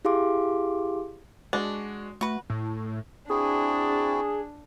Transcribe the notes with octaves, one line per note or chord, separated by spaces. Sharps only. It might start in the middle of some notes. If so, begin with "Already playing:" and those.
E4 G4 G#4 F5 C6 D6
G#3 D4 F#4
A3 F#4 B4
A2
C4 D4 E4 F#4 G#4